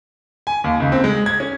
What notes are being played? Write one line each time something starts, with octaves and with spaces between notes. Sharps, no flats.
G#5
D#2
C#2
C4
G#3
G#6
C#4